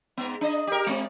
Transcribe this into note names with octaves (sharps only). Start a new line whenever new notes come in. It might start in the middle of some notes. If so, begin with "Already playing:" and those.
G#2 B3
D4 D#5
G4 A#4
G#3 C4